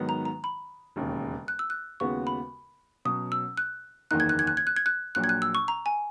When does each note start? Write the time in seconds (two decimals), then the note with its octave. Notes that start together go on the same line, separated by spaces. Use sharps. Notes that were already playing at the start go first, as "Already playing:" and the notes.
Already playing: G#2 D#3 F#3 B3 D#4
0.09 A#5
0.25 A#5
0.44 B5
0.96 E1 D#2 C#3
1.48 F#6
1.59 E6
1.70 F#6
2.00 D#2 C#3 G#3 B3 F#4 C#6
2.27 B5
3.05 B2 F#3 C#4 D#6
3.32 E6
3.57 F#6
4.11 F#1 E2 D#3 A#3 D#4 F#6
4.20 G#6
4.29 F#6
4.39 G#6
4.47 F#6
4.57 G#6
4.67 F#6
4.77 G#6
4.86 F#6
5.15 A#1 A#2 F#3 F#6
5.24 G#6
5.29 F#6
5.42 E6
5.55 C#6
5.68 A#5
5.86 G#5